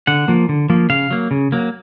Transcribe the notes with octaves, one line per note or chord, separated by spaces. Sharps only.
D3 F#5
F3 A#3
D3
F3 A#3
C#3 F5
F#3 A#3
C#3
F#3 A#3